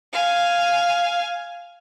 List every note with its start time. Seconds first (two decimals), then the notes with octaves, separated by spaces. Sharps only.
0.13 F5 G#5